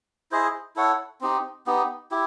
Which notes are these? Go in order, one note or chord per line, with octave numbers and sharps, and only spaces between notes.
E4 G#4 C5 D#5
E4 A4 C#5 F#5
C4 D#4 G4
B3 D#4 G4
E4 G4